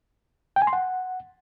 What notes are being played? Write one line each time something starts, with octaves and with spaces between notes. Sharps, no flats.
G5
G#5
C6
F#5